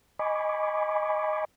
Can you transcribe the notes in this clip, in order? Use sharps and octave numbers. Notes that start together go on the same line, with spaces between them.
D#5 G#5 B5 C#6 D6